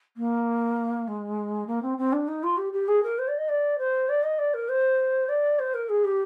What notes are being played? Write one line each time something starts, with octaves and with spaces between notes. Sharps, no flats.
A#3
G#3
A#3
C4
C4
D4
D#4
F4
G4
G4
G#4
A#4
C5
D5
D#5
D5
C5
D5
D#5
D5
A#4
C5
D5
C5
A#4
G#4
G4